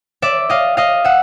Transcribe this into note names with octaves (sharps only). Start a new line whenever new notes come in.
D5 E5
D#5 F5
D#5 F5
E5 F#5